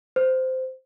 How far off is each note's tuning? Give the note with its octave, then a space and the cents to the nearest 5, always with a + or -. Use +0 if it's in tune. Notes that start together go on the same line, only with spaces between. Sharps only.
C5 -15